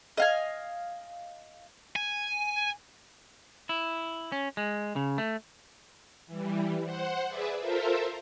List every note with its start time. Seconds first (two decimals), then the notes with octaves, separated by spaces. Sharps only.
0.17 D#5 F5 G#5
1.96 G#5
3.69 E4
4.32 C#4
4.57 G#3
4.96 C#3
5.18 A3
6.27 E3 G3
6.84 C5 F#5
7.27 G#4 B4 D5 E5
7.60 F4 A4 A#4 C5 E5